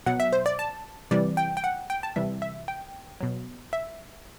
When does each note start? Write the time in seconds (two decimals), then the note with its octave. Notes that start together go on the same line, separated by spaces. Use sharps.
0.06 B2 F#3 F#5
0.20 E5
0.33 C5
0.46 D5
0.59 A5
1.11 C3 E3 G3 D5
1.37 G5
1.57 G5
1.64 F#5
1.90 G5
2.03 A5
2.16 C3 E3 G3 E5
2.42 E5
2.68 G5
3.21 B2 F#3
3.73 E5